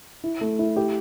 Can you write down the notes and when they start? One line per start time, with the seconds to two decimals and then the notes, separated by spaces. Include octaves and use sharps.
0.24 E4
0.41 A3
0.59 E4
0.76 G4